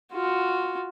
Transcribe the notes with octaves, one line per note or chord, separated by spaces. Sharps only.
F4 F#4